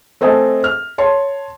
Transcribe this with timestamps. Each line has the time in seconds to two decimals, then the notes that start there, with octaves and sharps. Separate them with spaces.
0.21 A3 C4 D#5 G#5 A5
0.64 F6
0.98 C#5 A5 C6